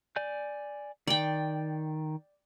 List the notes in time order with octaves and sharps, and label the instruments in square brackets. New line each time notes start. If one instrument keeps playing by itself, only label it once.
[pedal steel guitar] D5 G#5 G6
[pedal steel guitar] D#3 [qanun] D5 G5